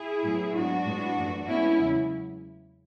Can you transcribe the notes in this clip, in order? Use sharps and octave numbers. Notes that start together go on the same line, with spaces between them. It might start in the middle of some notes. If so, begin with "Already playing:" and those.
Already playing: E4 G#4
A2 F#3 B3
G#2 F#3 B3 D4 F#4
A2 G#3 B3
F#2 E3 A3
A2 G#3 B3 C#4 E4
E2 C#3 F#3